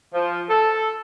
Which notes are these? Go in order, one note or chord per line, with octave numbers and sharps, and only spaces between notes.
F3
A4